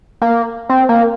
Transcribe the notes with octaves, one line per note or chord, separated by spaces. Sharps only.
A#3
C4
A#3